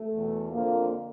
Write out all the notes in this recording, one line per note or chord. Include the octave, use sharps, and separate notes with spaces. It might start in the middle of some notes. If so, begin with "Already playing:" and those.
Already playing: A3
E2 B2
F2 D3 F3 A#3